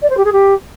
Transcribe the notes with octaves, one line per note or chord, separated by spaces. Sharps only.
D5
C5
G4
G#4
G4